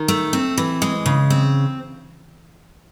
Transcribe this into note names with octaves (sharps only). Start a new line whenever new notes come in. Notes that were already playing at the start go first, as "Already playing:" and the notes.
Already playing: D#3
A3
C4
E3
G#3
C#3
C4